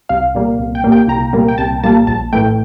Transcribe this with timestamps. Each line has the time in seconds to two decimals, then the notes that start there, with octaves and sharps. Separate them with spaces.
0.09 C2 F5
0.35 A#2 G3 A#3
0.59 C2
0.75 G5
0.84 A#2 G3 A#3
0.92 G5
1.08 C2 A#5
1.33 A#2 G3 A#3
1.48 G5
1.58 C2 A5
1.84 A#2 G3 A#3 A5
2.07 A#1 A5
2.33 A2 E3 A3 G5